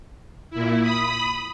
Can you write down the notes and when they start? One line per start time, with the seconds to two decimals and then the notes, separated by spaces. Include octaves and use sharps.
0.50 A#2 E4
0.82 B5 D#6